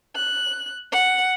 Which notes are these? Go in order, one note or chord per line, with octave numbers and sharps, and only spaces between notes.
F#6
F#5